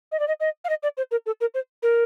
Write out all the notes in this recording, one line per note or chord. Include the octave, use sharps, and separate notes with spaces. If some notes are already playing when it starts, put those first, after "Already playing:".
D#5
D5
D#5
D#5
F5
D#5
D5
C5
A#4
A4
A#4
C5
A#4